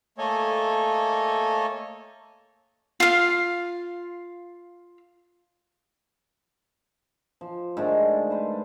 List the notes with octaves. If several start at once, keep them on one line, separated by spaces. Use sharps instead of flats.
A3 A#3 A4 C#5 D#5 G#5
F4 F5
F3
G#2 D#3 A3 D4
B4 C5